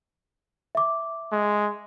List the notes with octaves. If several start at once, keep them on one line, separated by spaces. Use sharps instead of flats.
E5 D6
G#3